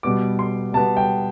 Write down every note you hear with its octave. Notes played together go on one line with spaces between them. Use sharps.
B2 G3 B3 D6
C6
B2 G3 B3 A5
G5